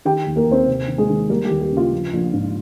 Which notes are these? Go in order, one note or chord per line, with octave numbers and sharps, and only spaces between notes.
D#3 G4 G5
D#2
A#3 A#4
D#2 C4 C5
C3
D#3
G#3 G#4
D#3
G3 A#3 A#4
G4
D#2
G4
C#3
F4
A#1
A#1
G#2